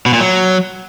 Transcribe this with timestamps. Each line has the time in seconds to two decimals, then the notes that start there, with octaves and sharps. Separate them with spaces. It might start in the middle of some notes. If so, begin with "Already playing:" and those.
0.06 B2
0.13 A#2
0.21 F#3